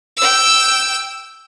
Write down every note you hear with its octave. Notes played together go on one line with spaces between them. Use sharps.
G5 E6